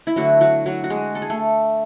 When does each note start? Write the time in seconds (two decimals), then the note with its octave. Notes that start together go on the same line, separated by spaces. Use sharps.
0.07 E4
0.16 D3 F#3 A3 F#4
0.41 F#3 F#4
0.66 F#3 F#4
0.84 F#4
0.90 G#3 G#4
1.15 A4
1.22 G#4
1.30 A3 A4